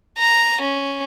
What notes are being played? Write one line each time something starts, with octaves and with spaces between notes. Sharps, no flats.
A#5
C#4